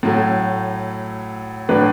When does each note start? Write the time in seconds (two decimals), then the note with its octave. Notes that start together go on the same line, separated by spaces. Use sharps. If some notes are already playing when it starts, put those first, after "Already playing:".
0.03 A2 F#3 A3
1.69 A2 F#3 D4 B4